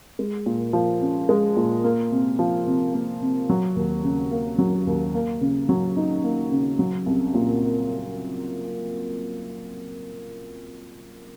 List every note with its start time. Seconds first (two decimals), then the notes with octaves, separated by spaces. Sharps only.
0.19 G#3
0.46 A#2
0.73 F3
1.01 C#4
1.29 G#3
1.57 A#2
1.84 A#3
2.11 C3
2.39 F3
2.67 C3
2.94 A#3
3.21 C3
3.50 F#3
3.76 D#2
4.04 C#3
4.31 A#3
4.58 F#3
4.87 D#2
5.14 A#3
5.41 C#3
5.69 F#3
5.96 D#4
6.24 A#3
6.52 C#3
6.79 F#3
7.06 C2
7.34 A#2